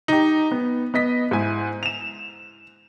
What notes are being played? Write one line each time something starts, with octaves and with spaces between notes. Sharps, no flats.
D#4 G4
B3
B3 D#5 B6
G#2 E4 G#5
E7 F7